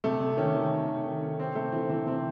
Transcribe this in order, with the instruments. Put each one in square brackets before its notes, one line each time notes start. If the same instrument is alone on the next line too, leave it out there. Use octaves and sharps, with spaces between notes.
[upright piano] C3 A3
C3
D#3 C#4
D#3
C3
C3
D#3
D#3
C3 C4
C3 A3
E3 C4
E3 C4
C3 C4